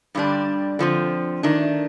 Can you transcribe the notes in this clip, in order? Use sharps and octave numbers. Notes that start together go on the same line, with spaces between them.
G2 D3 G3 D4
D3 F3 C4
D#3 A3 D4